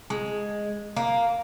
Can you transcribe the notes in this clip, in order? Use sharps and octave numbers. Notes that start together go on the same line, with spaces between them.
G#3
A#3